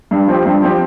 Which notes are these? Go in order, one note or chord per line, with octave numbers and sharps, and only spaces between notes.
G2
F3 C4 G4
G2
F3 C4 G4